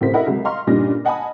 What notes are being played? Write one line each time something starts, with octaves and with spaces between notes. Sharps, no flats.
A1 A2 C3 A#4 C5 B6
E4 A4 A#4 D#5 F#5 B5
C2 F#3 G#3 A3
D#5 F5 A#5 C6 C#6 F6
G2 A#2 C#3 G3 D#4 A#6
D#5 F#5 G#5 A5 B5 D#6